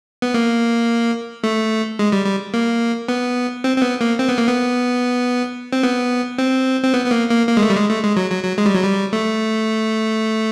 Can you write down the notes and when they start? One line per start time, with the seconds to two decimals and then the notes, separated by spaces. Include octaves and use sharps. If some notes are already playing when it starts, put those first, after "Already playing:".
0.22 B3
0.34 A#3
1.44 A3
1.99 G#3
2.12 G3
2.26 G3
2.54 A#3
3.08 B3
3.64 C4
3.76 C4
3.82 B3
4.01 A#3
4.19 C4
4.29 B3
4.38 A#3
4.48 B3
5.73 C4
5.83 B3
6.38 C4
6.84 C4
6.94 B3
7.06 B3
7.11 A#3
7.29 A#3
7.48 A#3
7.57 G#3
7.62 A3
7.70 G3
7.76 G#3
7.89 A3
8.03 G#3
8.16 F#3
8.30 F#3
8.43 F#3
8.58 G#3
8.66 G3
8.74 F#3
8.84 G3
9.13 A3